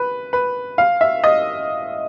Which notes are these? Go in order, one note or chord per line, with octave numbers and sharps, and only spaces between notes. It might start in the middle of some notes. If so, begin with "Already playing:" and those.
Already playing: B4
B4
F5
E5
D#5